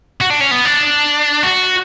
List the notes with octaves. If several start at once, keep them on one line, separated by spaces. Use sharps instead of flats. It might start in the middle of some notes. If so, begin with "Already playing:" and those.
F#4
D4
C#4
B3
D4
F#4